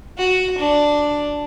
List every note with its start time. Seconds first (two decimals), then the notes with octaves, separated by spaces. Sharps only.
0.18 F#4
0.58 D4